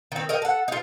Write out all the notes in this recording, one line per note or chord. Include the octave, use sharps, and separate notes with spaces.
D#3 C4
A#4 D#5 G5
A4 F#5
D#4 F4